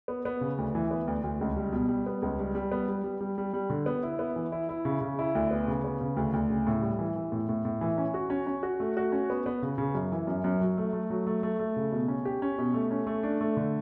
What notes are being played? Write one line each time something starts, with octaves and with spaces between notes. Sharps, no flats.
B3
B3
C#3
D2
E3
B3
D2
D2
C#2
G3
B2
G3
B3
C#2
G3
G3
B3
G3
G3
G3
G3
G3
D3
B3
E4
B3
E3
E4
E4
C#3
C#3
E4
D2
B3
C#3
B3
C#3
D2
D2
C#3
A2
G3
E3
E3
A2
A2
A2
E3
C#4
F#4
C#4
C#4
F#4
A3
F#4
C#4
B3
B3
C#3
C#3
F#2
E3
F#2
F#2
F#3
A3
A3
F#3
A3
A3
A3
C#3
B2
C#4
G4
C#4
B2
A3
C#4
A3
D4
A3
D3